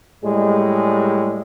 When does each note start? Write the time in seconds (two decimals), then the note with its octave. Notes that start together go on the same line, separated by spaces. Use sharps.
0.23 A2 G3 G#3